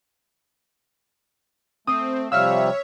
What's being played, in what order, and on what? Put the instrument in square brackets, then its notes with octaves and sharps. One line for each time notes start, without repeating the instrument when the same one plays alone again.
[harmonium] A3 [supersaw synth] C4 [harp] D#6
[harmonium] C3 F3 G3 [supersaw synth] C#5 E5 [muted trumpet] F5 [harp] E6 F6